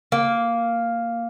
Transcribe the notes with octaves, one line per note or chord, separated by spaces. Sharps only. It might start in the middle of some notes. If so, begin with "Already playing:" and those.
A#3